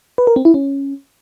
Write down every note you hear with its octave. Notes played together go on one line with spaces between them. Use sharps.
B4
A#4
C4
E4
C#4